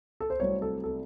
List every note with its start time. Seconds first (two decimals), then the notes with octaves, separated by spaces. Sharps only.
0.20 A4
0.30 C5
0.40 C2 C3 F#3 A3 C4 C#5
0.62 A4
0.84 A4